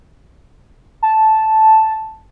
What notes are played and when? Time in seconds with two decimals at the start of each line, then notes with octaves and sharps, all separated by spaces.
1.03 A5